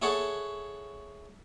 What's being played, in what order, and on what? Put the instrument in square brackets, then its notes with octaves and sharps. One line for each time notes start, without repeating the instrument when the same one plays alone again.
[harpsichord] E4 G#4 A4 C#5 F#5